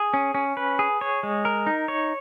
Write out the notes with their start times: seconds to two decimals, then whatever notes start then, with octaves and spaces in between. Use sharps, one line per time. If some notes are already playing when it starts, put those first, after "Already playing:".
Already playing: G#4
0.14 C#4
0.35 C#4
0.57 B4
0.79 G#4
1.01 C#5
1.23 G#3
1.45 A#4
1.67 D#4
1.88 C#5